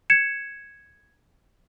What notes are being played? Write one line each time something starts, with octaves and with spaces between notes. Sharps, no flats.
G#6 C#7 E7